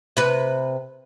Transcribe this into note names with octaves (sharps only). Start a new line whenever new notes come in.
C3 B4